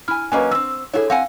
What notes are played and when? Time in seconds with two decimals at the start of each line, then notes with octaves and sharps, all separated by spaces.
0.08 E4 G#5 F6
0.32 F#3 A#3 C#4 B4 D#5 G#5
0.51 C4 C#4 E6
0.93 E4 F4 G#4 A4 C#5
1.10 C4 F5 F#5 G#5